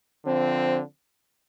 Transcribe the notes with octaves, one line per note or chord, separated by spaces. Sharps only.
D3 F3 C4